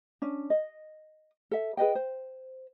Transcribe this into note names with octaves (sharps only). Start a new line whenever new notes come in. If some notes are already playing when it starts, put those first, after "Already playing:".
C#4 D4
D#5
A4 E5
G#4 B4 D#5 G5
C5